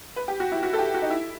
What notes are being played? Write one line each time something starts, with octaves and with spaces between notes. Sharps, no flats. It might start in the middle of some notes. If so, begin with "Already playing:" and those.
B4
G4
F#4
E4
F#4
A4
G4
F#4
D#4
E4